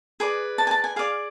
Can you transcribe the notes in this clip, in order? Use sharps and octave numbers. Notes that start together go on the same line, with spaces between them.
G#4 B4 D5
A5
G#5
A5
G#5
G#4 D5 F5